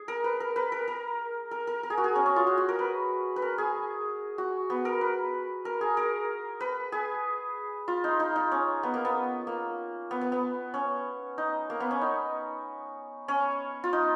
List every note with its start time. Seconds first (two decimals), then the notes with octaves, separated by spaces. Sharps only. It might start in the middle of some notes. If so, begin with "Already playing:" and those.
Already playing: G#4
0.08 A#4
0.24 B4
0.40 A#4
0.56 B4
0.72 A#4
0.88 A#4
1.51 A#4
1.67 A#4
1.83 A#4
1.90 G#4
1.98 F#4
2.04 G#4
2.16 C#4
2.26 C#4
2.36 F4
2.47 F#4
2.58 F#4
2.69 A#4
2.79 B4
3.36 B4
3.42 A#4
3.58 G#4
4.38 F#4
4.70 B3
4.85 A#4
5.01 B4
5.65 A#4
5.81 G#4
5.97 A#4
6.60 B4
6.92 G#4
7.88 F4
8.04 D#4
8.20 D#4
8.36 D#4
8.52 C#4
8.83 B3
8.94 A#3
9.05 B3
9.47 A#3
10.11 B3
10.21 B3
10.32 B3
10.74 C#4
11.38 D#4
11.70 A#3
11.80 B3
11.91 C#4
12.01 D#4
13.28 C#4
13.84 F4
13.93 D#4